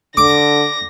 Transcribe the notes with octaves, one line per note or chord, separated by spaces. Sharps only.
D3 D6 A#6